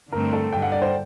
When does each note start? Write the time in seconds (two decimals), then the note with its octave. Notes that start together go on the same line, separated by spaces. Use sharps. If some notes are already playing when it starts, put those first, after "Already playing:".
0.12 G2 D3 A3 C4 A#4
0.33 A4
0.52 G2 D3 G3 G5
0.62 F#5
0.72 D5
0.82 C5